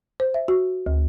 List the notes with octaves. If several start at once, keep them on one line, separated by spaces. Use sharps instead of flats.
C5
E5
F#4
D2